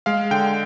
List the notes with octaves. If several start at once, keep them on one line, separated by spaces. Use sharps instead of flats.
G#3 F5
D3 G5